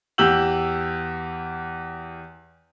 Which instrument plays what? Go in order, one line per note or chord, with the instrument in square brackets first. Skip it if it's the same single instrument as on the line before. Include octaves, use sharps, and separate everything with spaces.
[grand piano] E2 G4 E6 G6 F#7